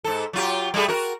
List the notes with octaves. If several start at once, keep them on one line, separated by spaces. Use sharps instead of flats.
G#2 A4
F#3 F4 G4
G3 A3 G#4
F#4 A#4